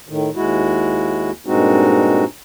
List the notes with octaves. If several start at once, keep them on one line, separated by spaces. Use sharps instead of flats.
A2 D#3
D#2 G#3 E4 F#4
G2 A#2 G#3 C4 D#4 F#4